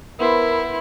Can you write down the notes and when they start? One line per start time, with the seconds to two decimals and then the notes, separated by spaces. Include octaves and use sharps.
0.20 B3 E4 A#4 C5